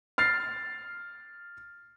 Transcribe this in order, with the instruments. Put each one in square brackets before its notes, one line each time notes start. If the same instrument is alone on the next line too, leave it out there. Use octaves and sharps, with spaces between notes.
[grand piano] F6 A6 C7